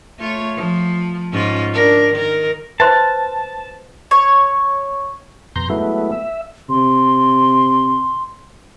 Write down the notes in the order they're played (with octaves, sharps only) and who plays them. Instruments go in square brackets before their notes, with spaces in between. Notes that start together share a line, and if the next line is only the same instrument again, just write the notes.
[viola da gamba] A3 F4 C#5
F3
G#2 C#4 F4
D4 A#4
D#3 A#4
[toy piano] B4 C5 C6 [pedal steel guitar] A5
[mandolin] C#5
[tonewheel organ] F2 B2 A#5 C6 G6
F#3 G#3 A3 B3 E4
E5
[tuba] C3 [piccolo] C6